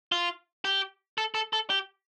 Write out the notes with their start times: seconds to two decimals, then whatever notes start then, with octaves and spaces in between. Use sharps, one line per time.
0.12 F4
0.65 G4
1.18 A4
1.35 A4
1.53 A4
1.70 G4